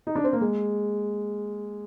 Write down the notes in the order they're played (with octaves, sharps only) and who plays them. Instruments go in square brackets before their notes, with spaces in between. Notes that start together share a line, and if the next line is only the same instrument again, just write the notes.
[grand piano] D#4
D4
C4
A#3
G#3